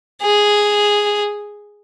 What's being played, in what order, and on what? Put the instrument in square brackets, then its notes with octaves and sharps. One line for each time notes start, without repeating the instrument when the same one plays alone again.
[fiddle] G#4